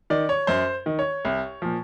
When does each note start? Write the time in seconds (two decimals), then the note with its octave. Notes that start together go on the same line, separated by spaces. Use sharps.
0.10 D#3 D5
0.29 C#5
0.47 F#2 C5
0.86 D#3
0.99 C#5
1.25 C2
1.62 A#2 F3